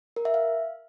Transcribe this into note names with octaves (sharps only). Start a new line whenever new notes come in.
A#4
E5
F5